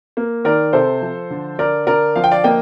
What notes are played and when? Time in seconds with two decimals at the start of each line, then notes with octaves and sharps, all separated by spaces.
0.17 A#3
0.45 D#3 A#4 D5
0.73 C3 A4 C5
1.02 F3
1.30 D3
1.58 D3 A#4 D5
1.87 D3 A#4 D5
2.16 F3 F5
2.24 G5
2.31 D5 F5
2.44 A#3 D#5 G5